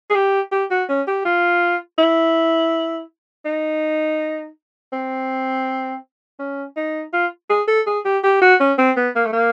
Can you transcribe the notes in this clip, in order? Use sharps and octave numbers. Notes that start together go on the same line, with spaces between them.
G#4
G4
G4
F#4
C#4
G4
F4
E4
D#4
C4
C#4
D#4
F4
G#4
A4
G#4
G4
G4
F#4
C#4
C4
B3
A#3
A3
A#3